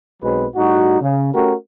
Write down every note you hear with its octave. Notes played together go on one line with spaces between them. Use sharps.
B1 B2 F#3 G#3 C4 B4
A2 G3 D#4 F#4
C#3
A3 C#4 F#4 G4 A#4